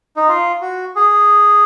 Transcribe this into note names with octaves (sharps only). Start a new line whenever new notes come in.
D#4
F4
F#4
G#4